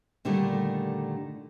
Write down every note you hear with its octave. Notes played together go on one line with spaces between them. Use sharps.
A#2 D3 D#3 G3 A3 A#3